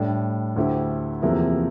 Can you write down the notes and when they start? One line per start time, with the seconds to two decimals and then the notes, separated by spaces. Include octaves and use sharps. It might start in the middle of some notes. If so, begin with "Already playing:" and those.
Already playing: A2 G3 D4
0.56 D2 D3 A3 E4 G4
1.22 E2 C3 F3 A#3 E4